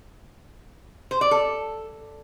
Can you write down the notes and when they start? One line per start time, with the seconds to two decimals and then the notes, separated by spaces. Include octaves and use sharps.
1.11 C5
1.21 D5
1.31 A4